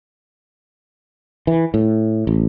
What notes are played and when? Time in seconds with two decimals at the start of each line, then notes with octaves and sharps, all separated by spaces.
1.47 E3
1.74 A2
2.27 A1